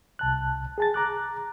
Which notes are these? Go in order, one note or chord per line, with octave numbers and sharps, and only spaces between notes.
C2 A5 F#6
G#4 A5 A6
A#5 D6 F#6